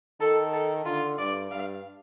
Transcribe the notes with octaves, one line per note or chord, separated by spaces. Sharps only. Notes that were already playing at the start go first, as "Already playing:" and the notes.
D#3 A4
A4
D3 F4
G2 D5
G2 F5